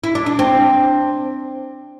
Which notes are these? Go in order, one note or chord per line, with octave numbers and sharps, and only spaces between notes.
E4
D4
D4
C4